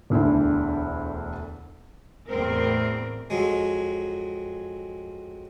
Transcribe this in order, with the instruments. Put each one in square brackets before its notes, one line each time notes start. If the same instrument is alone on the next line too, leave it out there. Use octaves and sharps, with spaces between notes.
[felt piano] E1 D2 D3 E4
[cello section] E2 A2 C4 A#4
[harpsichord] F2 F#3 G#3